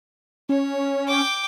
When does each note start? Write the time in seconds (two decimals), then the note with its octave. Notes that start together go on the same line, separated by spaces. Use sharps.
0.49 C#4 C#5
1.07 G5 D6